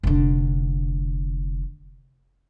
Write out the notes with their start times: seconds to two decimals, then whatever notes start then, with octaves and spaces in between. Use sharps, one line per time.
0.03 F1 D3